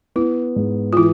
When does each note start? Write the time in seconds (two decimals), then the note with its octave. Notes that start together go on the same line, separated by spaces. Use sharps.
0.16 B3 E4
0.56 G#2
0.93 F4
0.97 E3 E4